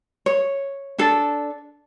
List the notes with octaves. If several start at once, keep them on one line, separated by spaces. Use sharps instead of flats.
C#5
D4 A4